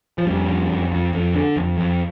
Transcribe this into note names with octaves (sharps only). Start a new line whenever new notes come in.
F3
F2 G3
F2
F2
F2
F2
D3
F2
F2